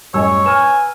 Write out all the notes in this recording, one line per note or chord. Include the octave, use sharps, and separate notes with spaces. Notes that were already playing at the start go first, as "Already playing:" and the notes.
F#2 A2 G3 C#5 D#5 G#5 E6
B4 G#5 A#5 F6 E7